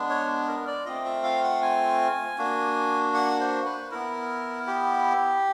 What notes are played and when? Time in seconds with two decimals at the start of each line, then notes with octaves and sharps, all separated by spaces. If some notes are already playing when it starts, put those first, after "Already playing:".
Already playing: G#3 B3 D4
0.09 C#5
0.48 A#4
0.67 D5
0.85 A3 C4 F4 D#5
1.05 E5
1.24 F5
1.43 F#5
1.62 G#5
2.38 A#3 D4 F#4
3.15 F#5
3.40 C5
3.65 B4
3.91 B3 E4 A#4
4.67 G4